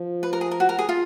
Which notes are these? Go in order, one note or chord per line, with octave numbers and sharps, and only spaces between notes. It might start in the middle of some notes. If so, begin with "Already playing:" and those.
Already playing: F3
B4
A#4
G#4
A#4
F#4
A#4
G#4
F4